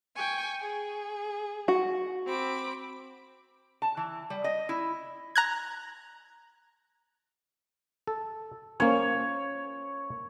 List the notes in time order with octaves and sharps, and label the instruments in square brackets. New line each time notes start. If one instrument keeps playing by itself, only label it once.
[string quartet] G5 G#5 C#6
G#4
[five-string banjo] F#4
[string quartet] C4 B5 D6
[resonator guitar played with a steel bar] A5
E3
G3
D#5
E4
[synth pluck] A#5 F#6 G#6
[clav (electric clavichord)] A4
[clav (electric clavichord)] A#3 C#4 [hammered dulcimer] C#5